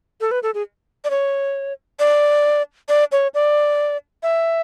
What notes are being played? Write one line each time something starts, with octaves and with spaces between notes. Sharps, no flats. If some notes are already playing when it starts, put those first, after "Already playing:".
A4
B4
A4
G#4
D5
C#5
D5
D5
C#5
D5
E5